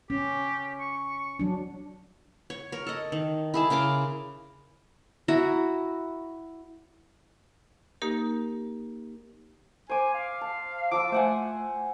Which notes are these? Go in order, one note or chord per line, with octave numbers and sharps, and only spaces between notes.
C#4 G4
C#6
F#3 D4
C#5
A#4 C#5
A4 D#5
D#3
E4 G#4 A5
C#3 A#4 C6 D6
E4 F#4 A#5
A#3 D#4 G4 A#4
C5 G#5 D6
F5
A5
F3 A5 D6 E6
A3 C5 F#5 G#5